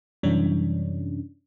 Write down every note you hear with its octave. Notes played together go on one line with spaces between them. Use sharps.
F#2 C3 E3 G3 C#4 D4